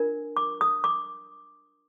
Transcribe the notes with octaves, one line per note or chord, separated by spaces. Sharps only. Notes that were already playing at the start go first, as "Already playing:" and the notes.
Already playing: D4 F4 A#4
D6
D#6
D6